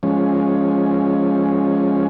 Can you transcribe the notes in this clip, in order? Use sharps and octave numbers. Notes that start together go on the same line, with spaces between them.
F3 G#3 C#4